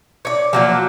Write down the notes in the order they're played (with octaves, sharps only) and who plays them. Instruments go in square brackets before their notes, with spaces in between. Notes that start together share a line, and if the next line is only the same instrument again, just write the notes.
[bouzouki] C#5 D5
F3 F#3 A#3